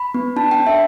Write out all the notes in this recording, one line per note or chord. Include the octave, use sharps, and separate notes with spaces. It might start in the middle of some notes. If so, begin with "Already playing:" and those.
Already playing: B5
B3
D4 A5
G5
D4
E5